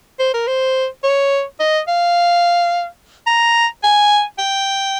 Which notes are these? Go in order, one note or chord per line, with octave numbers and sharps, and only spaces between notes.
C5
A#4
C5
C#5
D#5
F5
A#5
G#5
G5